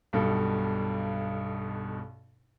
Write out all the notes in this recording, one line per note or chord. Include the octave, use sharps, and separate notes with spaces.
B1 G2 B2 A4